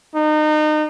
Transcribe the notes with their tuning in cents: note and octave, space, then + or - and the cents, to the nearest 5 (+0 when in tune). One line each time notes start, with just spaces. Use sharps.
D#4 -30